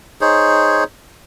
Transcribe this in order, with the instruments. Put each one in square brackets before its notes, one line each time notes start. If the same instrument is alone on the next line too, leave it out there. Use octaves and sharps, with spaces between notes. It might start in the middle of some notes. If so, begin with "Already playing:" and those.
[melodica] D#4 G#4 C5 C#5